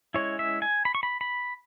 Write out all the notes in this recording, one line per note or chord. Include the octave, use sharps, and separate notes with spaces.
G#3 C#4 E4 C#5
E5
G#5
B5
C#6
B5
B5